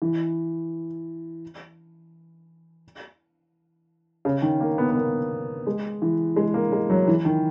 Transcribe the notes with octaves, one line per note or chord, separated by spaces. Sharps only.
E3
C#3
D#3
A#3
B3
B3
A#3
G#3
E3
G#3
A#3
G#3
F#3
E3
D#3